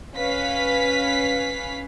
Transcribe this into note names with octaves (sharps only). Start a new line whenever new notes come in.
C#4 B4 F5 B6